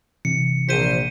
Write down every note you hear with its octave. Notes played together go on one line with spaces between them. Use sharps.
C3 E3 C#7
A#1 C5 B6 D#7